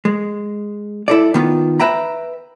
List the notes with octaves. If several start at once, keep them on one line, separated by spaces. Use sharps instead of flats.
G#3
E4 A4 D5
D#3 B3 F4
B4 E5 G5 A#5 B5